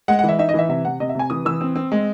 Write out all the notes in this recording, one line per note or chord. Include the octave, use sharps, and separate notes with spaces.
G#3 F#5
F#5
E3 E5
D#4 E5
D#5
E3 E5
C3 E5
C3 F#5
C3 D#5
E5
C3 G#5
E3 D#6
E3 E6
C4
C4
G#3